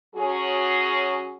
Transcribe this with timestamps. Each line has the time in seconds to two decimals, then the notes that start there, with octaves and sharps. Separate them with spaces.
0.15 F#3 C#4 F#4 G#4